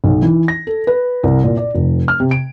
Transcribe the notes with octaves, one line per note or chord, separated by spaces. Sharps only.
B1
E3
A#6
A4
B4
C2
A#2
D5
F1
F6
C3
D7